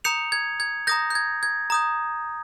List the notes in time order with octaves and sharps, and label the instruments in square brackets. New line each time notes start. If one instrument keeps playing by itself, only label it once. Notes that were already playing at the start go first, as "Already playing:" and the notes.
[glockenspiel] A#5 D#6 G6 C#7 F7
G#6
G#6
A#5 D#6 G6 A#6
G6
G#6
G#6
A#5 D#6 G6